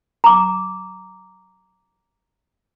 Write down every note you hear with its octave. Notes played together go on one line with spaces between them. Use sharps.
A#5 D6